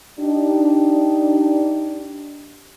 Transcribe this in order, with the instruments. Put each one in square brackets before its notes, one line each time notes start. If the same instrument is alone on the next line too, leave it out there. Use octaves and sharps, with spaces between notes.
[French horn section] D4 D#4 G4